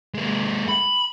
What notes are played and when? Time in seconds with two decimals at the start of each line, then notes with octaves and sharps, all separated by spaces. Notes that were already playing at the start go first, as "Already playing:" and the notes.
0.14 G#3 A#3
0.68 B5